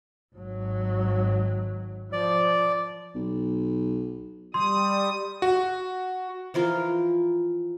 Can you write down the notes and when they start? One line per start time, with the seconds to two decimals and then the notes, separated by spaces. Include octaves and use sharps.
0.36 G#1 F#3
2.13 F3 D5
3.15 B1
4.54 G3 C6 D#6
5.42 F#4
6.54 E3 F3 F4 A#4